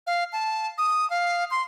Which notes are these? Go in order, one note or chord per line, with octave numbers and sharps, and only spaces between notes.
F5
A5
D#6
F5
C6